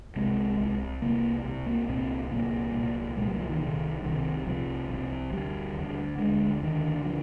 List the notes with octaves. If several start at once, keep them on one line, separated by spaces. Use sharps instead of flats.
C2 C3 G#3
C2 C3
C2 C3 A#3
C2 C3
A#3
C2 A#2 C4
C2 A#2 A#3
C2 A#2
C2 A#2 G#3
G3
D#3
F3
D#3
C2 C3 D#3
C2 C3 D#3
C2 C3 F3
C2 C3
D2 D3 G3
D2 D3
D2 D3 G#3
D2 D3 D#3
D3 F3